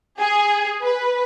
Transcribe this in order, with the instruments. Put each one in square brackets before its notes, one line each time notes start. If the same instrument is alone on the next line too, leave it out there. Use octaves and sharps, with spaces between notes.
[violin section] G#4
B4